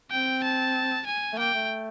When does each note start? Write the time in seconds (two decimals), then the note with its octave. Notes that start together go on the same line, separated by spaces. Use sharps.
0.11 C4 G5
0.43 A5
1.06 G#5
1.33 A3
1.38 A#3 G5
1.54 A3